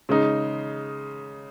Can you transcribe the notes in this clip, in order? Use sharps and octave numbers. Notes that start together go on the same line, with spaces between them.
C#3 G#3 D#4